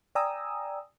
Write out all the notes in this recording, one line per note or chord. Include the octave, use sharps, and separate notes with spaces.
D5 G5 G#5 A#5 D#6 E6